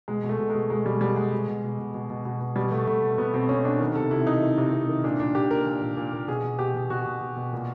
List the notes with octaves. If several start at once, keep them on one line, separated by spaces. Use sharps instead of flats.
B2 G#3
B2
A3
B2
B2 G#3
B2 G#3
B2 G3
B2 G3
B2 G#3
B2
B2
B2
B2
B2
B2
B2
B2
B2 G3
B2 A3
B2 A3
B2
B2 B3
B2 C4
B2 C#4
B2 D4
D#3
C3 A4
C3 E4
D#3 D#4
D#3
C3
C3
D#3
A#2 D4
A#2 D4
A#2 G4
A#2 A#4
A#2
A#2
A#2
A#2
B2 G#4
B2
B2 G4
B2
B2 F#4
B2
B2
B2
A#2